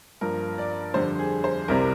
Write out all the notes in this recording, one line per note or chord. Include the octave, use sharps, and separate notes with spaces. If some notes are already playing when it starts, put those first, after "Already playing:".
G2 F3 A#3 A#4
D5
F2 D3 G3 C5
G#4
C5
C2 C3 G3 C4 A#4